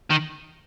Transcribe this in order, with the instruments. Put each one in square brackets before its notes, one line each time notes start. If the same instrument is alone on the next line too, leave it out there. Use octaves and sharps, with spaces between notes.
[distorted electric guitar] D#3